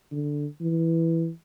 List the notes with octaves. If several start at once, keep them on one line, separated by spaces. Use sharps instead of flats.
D3
E3